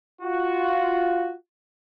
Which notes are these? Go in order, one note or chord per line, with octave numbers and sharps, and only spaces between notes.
F4 F#4